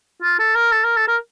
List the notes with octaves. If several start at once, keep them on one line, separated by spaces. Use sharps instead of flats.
F4
A4
A#4
A4
A#4
A4
A#4